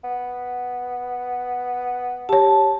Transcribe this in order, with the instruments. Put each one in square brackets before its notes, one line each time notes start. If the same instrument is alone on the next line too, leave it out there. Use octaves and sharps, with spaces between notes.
[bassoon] B3
[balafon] G4 C#5 [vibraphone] A5